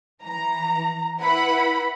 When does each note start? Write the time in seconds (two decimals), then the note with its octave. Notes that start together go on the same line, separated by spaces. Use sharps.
0.22 E3 A#5
1.20 E4 B4 F#5 B5